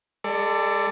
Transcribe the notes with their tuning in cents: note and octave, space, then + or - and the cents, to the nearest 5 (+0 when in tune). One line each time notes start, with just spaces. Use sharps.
G#3 -30 A4 +25 D5 +0